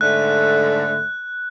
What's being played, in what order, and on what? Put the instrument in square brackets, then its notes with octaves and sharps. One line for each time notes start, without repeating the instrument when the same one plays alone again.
[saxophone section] G#2 D3 A3 [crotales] F#6